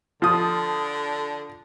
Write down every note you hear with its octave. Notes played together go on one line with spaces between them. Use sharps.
D3 F3 D#6